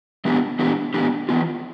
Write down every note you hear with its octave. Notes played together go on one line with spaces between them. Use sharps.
E3 B3 D4 G4
E3 B3 D4 G4
E3 B3 D4 G4
E3 B3 F4